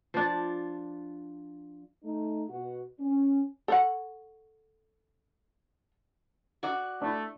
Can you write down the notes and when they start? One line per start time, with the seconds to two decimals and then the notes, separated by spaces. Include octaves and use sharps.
0.14 F3 D4
2.03 A3 D#4
2.48 B2 F#4
2.99 C#4
3.68 A4 C#5 F#5
6.63 F#4 D5
7.02 A3 D4 E4